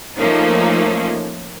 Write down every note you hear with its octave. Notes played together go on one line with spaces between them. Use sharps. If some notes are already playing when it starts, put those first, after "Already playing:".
F3 A3 A#3 C#4 D#4